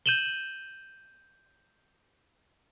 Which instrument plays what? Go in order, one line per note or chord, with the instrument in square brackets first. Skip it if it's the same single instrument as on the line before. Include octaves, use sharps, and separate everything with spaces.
[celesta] G6 D#7 E7 F#7 G7